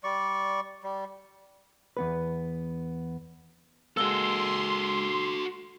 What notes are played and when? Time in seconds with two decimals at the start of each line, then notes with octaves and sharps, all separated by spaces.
0.04 G3 D5 C#6
0.83 G3
1.97 E2 B3 B4
3.97 G#3 A#3 F#4 A4 C6 E6 G7